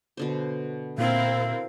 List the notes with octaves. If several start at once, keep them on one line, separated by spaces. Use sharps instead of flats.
B2 D3 C5
A#2 C4 E4 A#4 F5